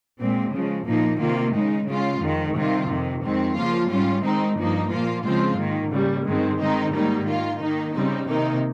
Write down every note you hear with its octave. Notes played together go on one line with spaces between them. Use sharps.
A#2 G#3 C4
C#3 F3 G#3
A#2 F3 A#3 D#4
C3 D#3 A#3 F4
C#3 G#3 D#4
C#3 G#3 C#4 F4
F2 D#3 G#3
C3 D#3 G3 C4 F4
F2 C3 D#3
F2 D#3 G#3 C4
C#3 F3 A#3 F4
G#2 G3 C#4 F4
D#3 G#3 C4 D#4
G2 F3 A#3 D#4
A#2 F3 A#3 F4
C#3 F3 G#3 C4 F4
G#2 D#3 A#3
C#3 G3 A#3
G2 D#3 G#3 C4
D#3 G#3 C4 D#4
G#2 D#3 G3 A#3 D#4
D#3 A#3 F4
D#3 A#3 D#4
C#3 G3 C4 D#4
C3 D#3 A#3 D#4